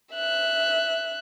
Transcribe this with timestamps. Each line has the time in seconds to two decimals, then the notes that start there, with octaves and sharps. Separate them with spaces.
0.14 E5 F#6